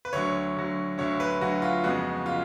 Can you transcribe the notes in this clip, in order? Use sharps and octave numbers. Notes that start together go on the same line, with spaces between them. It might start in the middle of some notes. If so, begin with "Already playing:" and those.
B4
D2 D3 F#3 C#5
D2 D3 F#3
D2 D3 F#3 C#5
B4
D2 D3 F#3 F#4
F4
F2 C#3 G#3 B3 F#4
C#3 G#3 F4